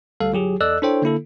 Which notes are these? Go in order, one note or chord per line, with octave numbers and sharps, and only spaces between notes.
D2 G3 A4 F5
G1 F#3 G4 G#4
E2 A4 D5 D#5 E6 F#6
D4 E4 A4 C5 C#5 G5
D3 A#3 E4 A4